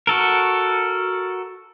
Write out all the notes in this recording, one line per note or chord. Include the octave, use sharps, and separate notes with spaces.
F#4 A4 A#4